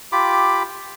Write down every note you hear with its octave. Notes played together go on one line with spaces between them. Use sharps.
F4 G4 B5 D6